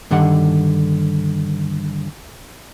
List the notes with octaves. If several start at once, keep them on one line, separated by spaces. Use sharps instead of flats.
G2 D3 D#3 F#5